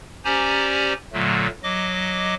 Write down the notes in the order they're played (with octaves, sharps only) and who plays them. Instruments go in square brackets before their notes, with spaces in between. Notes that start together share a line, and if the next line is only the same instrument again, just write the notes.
[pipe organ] C#4 G4 C5 D5 G#5 A#5
A#2 D3 F#3 A3
F#3 D#5 D6